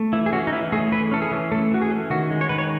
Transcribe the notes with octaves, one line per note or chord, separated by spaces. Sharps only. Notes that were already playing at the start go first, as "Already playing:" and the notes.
Already playing: A3
E3 E4
G#4
C#4 F#4
D#4
E3 E4
A3 G#4
E3 B4
C#4 A4
G#4
E3
A3 A4
E3 F#4
G#4
C#4
D#3 F#4
G#3
C#5
D#3 B4
C#5